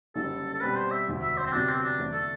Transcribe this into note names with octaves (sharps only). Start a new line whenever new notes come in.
F#1 F#2 D3 G3 A4
A4
B2 G3 C4 B4
C5
E5
E1 D2 D3
E5
C5
C4
D2 C3 F#3 B3 D4 F#4
C4
D4
E2 D3 A3 D4
A4